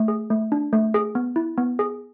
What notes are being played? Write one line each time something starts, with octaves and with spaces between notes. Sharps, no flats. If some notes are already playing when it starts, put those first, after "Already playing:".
Already playing: A3
G#4
A3
D4
A3
G#4
B3
E4
B3
G#4